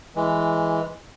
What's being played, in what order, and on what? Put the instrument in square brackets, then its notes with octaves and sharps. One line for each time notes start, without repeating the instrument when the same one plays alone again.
[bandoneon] E3 G#3